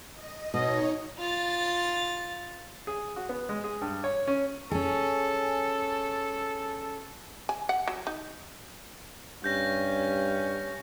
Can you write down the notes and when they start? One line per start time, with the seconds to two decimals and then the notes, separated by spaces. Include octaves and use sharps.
0.14 D#5
0.54 B2 D#4 C#5 D#5
1.18 F4 A6
2.87 G#4
3.16 F#4
3.29 B3
3.49 G#3
3.64 G#4
3.81 G2
4.04 C#5
4.28 C#4
4.71 C#4 G#4 A4
7.49 G#5
7.69 F#5
7.88 F#3
8.07 D#4
9.44 G2 C#4 G6 A#6